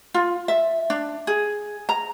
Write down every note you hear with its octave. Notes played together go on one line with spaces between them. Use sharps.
F4
E5
D4
G#4
A#5